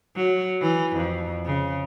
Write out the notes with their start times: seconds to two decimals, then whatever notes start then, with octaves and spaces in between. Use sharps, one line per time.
0.16 F#3
0.61 E3
0.96 F2
1.45 C#3